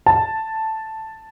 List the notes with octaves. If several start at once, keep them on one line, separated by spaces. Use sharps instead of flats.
A5